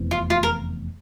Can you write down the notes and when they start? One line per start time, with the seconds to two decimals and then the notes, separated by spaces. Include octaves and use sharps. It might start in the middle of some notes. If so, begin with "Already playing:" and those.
Already playing: F1 E2 C3 E3
0.11 F4
0.30 F4
0.43 A#4